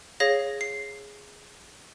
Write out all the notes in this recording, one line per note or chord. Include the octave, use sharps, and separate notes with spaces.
G#4 C#5 F5 A#6
C7